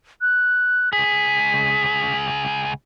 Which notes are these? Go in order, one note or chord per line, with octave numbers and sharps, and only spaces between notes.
F#6
C#2 G#4 B6